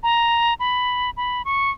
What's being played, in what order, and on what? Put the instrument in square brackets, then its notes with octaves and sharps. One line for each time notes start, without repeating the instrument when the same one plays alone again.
[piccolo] A#5
B5
B5
C#6